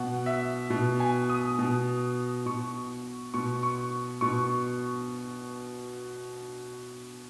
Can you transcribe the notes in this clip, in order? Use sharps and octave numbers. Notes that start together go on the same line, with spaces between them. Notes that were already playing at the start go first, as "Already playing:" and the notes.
Already playing: B2 F#5
E5
B2
G#5
D#6
B2
B2 C#6
B2 C#6
C#6
B2 C#6